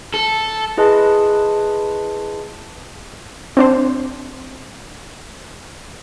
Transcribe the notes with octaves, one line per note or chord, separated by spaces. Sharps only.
A4
E4 G#4 B4 D#5 A5 C6
C4 D4 C5